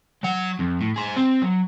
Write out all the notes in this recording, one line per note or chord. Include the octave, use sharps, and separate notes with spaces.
F#3 F#5
F2
A2
G#4 C5
C4
F#3